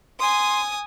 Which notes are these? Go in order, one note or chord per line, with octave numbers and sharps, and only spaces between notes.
G#5 C6 D#6